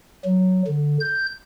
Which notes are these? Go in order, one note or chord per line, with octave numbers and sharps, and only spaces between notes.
F#3
D3
G6